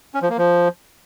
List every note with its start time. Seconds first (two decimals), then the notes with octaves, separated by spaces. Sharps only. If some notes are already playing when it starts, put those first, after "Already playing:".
0.14 C#4
0.22 F3
0.30 A#3
0.38 F3